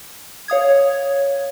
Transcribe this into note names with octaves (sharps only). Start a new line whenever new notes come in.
C#5 F5 D#6 G#6